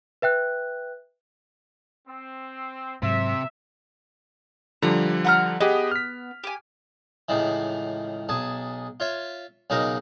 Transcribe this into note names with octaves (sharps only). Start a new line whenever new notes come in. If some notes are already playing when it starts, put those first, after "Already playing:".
B4 E5 G5 F#6
C4
G#2 C3 F#3 E5
D3 F3 G3 A#5
F#5 A#5 F6
B3 G4 G#4 D#5
F6 B6
G4 G#5
C#2 A2 D#3 E3
B1 G#4 A5
F4 C#5 E5
B1 C#3 D#4 F#4 A#4